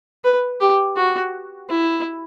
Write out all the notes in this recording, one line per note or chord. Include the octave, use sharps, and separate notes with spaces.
B4
G4
F#4
E4